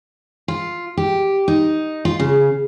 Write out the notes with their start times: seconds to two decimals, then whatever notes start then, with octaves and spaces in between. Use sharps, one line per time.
0.48 F4
0.97 G4
1.48 D#4
2.05 F4
2.19 C#3